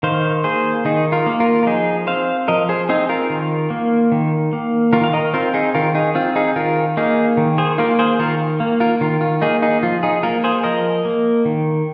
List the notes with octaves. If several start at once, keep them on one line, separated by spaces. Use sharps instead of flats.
D#3 C5 F5
A#3 G#4 C5
D#3 D#4 G#4
F4 A#4
A#3
F4 A#4
A#4
F3 D#4 G#4
C4 C5 F5
F3 A#4 D#5
G#4 C5
C4 D#4 G#4
F4 A#4
D#3
A#3
D#3
A#3
D#3 F4 A#4
F5
A#4 D#5
C4 F4 A#4
D#4 G#4
D#3 F4 A#4
D#4 G#4
C4 F4
D#4 G#4
D#3 F4 A#4
A#3 D#4 G#4
D#3
G#4 C5
A#3 F4 A#4
G#4 C5
D#3 F4 A#4
A#3
F4 A#4
D#3 F4
F4
A#3 D#4 G#4
D#4 G#4
F3 F4
D#4 G#4
A#3 F4 A#4
G#4 C5
F3 A#4 D#5
A#3
D#3